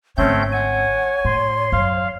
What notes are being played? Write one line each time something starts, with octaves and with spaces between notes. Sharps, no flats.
G#1 D3 A3 C4 C#4 C#5 G6
F#5 G#5
A2 C6
F#2 F5